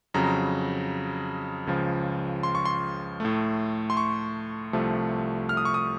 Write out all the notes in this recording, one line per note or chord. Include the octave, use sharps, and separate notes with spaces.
F2 C#3 F#3 A#5
C#2 C#3 F3
C6
C#6
C6
A2 A3
C6
C#6
C2 C3 F3 A3
F6
D#6
C#6
D#6